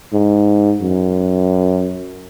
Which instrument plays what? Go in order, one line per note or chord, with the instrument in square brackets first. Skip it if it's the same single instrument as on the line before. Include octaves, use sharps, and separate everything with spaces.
[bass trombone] G#2
F#2